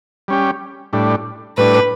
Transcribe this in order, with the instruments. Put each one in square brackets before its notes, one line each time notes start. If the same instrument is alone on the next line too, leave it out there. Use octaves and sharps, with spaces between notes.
[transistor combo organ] G3 C#4 G4
A2 G3 D4
[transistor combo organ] A2 G3 D4 [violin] B4